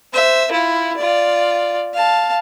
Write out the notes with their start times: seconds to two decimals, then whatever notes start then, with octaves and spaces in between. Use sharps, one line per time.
0.13 C5 E5
0.51 E4 F4
0.97 F4 D5
1.93 F5 A5